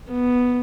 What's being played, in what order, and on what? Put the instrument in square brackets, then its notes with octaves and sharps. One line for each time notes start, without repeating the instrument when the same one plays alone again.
[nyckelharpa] B3